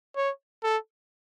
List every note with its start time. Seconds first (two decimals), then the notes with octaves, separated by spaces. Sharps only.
0.16 C#5
0.63 A4